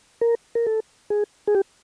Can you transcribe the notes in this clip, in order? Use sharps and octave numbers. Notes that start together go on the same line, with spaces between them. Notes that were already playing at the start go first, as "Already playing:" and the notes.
A#4
A#4
A4
G#4
G#4
G4